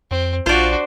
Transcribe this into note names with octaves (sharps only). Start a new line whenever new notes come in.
F2 C4
A#1 D4 F4 F#4 C5 D5